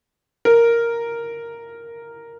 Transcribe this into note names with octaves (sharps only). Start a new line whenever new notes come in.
A#4